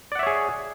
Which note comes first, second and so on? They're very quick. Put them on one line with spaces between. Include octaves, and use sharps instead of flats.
D5 F#5 E5 C#5 G#4